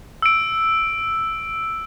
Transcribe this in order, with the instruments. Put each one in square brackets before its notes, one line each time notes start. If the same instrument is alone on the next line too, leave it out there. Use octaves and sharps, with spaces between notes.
[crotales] E6 D7